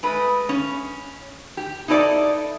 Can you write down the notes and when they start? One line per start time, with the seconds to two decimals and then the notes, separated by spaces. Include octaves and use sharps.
0.03 G#3 A3 B4
0.49 C#4
1.57 G4
1.88 D#4 E4 A4 A#4 D5